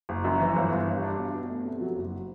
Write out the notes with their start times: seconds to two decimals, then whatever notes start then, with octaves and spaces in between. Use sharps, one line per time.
0.09 F#1
0.24 F#2
0.40 E3
0.56 G1
0.71 G1
0.87 G2
1.03 D4
1.18 B2
1.34 B2
1.49 A3
1.65 C3
1.81 F#3
1.96 F#1